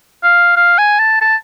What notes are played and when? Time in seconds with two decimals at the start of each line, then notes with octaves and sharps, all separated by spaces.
0.23 F5
0.57 F5
0.78 G#5
0.99 A5
1.21 A5